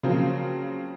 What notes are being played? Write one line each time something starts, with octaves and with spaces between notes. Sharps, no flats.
C#3 F3 F#3 A#3 C4